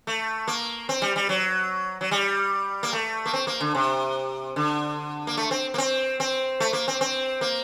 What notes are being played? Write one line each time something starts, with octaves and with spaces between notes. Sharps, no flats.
A3
A#3
C4
G3
G3
F#3
F#3
G3
A#3
A3
A#3
C4
A#3
D3
C3
D3
A#3
A3
C4
A#3
C4
C4
A3
A#3
C4
C4
A#3